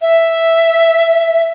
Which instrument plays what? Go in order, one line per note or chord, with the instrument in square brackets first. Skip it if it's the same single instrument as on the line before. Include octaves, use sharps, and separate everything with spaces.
[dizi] E5